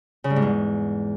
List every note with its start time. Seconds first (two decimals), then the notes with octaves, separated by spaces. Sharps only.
0.24 C#3
0.30 G2
0.36 G#2
0.42 E2